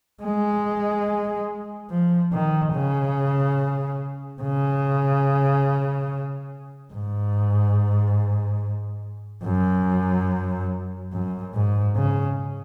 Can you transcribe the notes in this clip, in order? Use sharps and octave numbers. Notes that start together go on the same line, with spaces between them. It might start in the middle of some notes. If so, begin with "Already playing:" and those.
G#3
F3
D#3
C#3
C#3
G#2
F#2
F#2
G#2
C#3